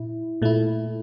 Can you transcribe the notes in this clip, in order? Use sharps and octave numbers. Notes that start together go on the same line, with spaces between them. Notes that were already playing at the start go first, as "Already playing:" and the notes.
Already playing: A#2 E4
A#2 A3 E4